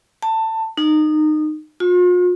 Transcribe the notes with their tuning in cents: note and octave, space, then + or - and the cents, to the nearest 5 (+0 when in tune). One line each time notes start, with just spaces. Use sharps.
A5 +20
D#4 -25
F4 +45